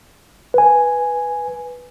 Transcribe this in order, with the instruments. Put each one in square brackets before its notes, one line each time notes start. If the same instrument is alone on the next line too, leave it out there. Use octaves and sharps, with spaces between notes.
[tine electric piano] B4 G#5